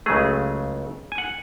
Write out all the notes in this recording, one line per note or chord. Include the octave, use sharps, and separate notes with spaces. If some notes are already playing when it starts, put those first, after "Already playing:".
C#2 C#3 F#3 A3 G#4
G#5
F#5